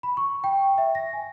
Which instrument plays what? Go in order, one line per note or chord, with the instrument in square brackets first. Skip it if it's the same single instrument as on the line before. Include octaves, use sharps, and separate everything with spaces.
[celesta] B5
C#6
G5
E5
A#6
G#5